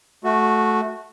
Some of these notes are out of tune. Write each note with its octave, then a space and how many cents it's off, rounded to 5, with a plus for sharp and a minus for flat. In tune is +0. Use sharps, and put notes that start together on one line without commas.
A3 -15 F#4 -10